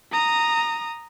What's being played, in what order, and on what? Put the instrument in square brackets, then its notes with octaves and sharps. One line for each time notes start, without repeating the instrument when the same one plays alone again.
[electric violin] A#5 D#6